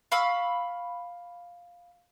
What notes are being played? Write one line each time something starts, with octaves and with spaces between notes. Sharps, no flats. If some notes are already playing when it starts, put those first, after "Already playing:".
F5 B5 C#6 E6